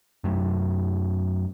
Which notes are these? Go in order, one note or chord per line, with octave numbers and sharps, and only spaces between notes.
F#2 F#3 A3